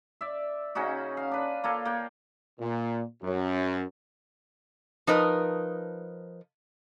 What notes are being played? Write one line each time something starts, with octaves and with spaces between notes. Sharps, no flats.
D5 E5
C#3 C#4 D#4 F#4
F5
D4 B4
A#3 F4 A4
A#3 G5
A#2
F#2
F3 D#4 A#4 B4